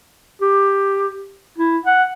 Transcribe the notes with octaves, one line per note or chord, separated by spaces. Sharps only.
G4
E4
F#5